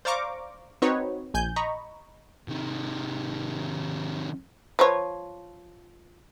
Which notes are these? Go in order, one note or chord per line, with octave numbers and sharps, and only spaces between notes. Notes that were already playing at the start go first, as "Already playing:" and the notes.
C5 D5 F5 A#5 C#6 D6
C4 D#4 F#4 B4 C#5
A#1 G#5 G6
D#5 A#5 B5 C#6
C3 D#3
F3 B4 C#5